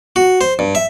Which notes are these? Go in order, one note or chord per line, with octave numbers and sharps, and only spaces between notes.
F#4
C5
G2
E5